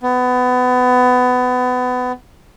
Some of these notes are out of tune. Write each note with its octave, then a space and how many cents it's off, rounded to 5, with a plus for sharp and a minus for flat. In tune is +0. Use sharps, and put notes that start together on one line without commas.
B3 +25